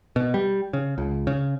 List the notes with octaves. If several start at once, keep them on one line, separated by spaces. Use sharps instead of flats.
B2
G3
C#3
C#2
C#3